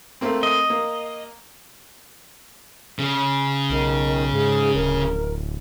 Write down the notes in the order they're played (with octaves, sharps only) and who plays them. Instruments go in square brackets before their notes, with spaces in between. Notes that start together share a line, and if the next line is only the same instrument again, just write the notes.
[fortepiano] A3 A#3 C4
[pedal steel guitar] D#5
[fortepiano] A#3
[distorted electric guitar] C#3
[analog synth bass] B1 [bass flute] D#3
[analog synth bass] G#2 [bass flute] G#4
[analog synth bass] D1 [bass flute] A#4